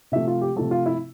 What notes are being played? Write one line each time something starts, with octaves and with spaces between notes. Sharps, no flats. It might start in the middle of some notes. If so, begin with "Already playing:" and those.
C3 F3 A3 E5
F4
G4
C3 F3 A3 A4
F4
E4